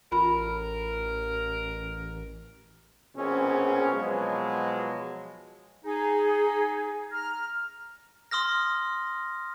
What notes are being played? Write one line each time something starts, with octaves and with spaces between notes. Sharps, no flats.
A1 F4 A#4 B5
A#1 B2 C4 C#4 G#4
B2 F3 F#3 G#3 B3
D#4 G#4
A#5 F6
C6 D#6 F6 A#6